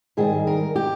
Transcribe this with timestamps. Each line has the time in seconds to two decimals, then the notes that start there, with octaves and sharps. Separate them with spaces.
0.17 G#2 D#3 G3 G#4
0.47 A#4
0.76 G4